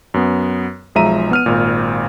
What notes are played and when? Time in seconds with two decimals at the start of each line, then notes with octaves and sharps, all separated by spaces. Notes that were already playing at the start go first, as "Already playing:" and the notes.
0.14 F#2 B3
0.95 B1 F3 G#3 E5 A#5 D#7
1.31 B3 F6 D#7
1.46 G#1 A#2